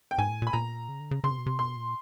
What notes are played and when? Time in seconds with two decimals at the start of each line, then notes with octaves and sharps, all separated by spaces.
0.11 G5
0.18 G#2 G#5
0.30 A2
0.42 A#2
0.47 B5
0.53 A#2 A#5
0.89 C#3
1.00 D3
1.11 C#3
1.24 C#3 C6
1.31 C3
1.38 B2
1.46 C3
1.59 B2 C6
1.76 A#2